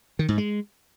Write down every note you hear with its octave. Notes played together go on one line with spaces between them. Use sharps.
D#3
G#2
G#3